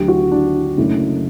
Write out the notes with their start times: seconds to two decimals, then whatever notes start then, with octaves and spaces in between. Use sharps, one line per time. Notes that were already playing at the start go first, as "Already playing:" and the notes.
Already playing: D2 D3 F#3 A3 G4
0.08 F#4
0.31 D4
0.77 F#1 F#2 F#3 A3